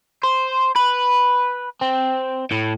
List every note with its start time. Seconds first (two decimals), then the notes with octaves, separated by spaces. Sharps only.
0.23 C5
0.76 B4
1.81 C4
2.51 A2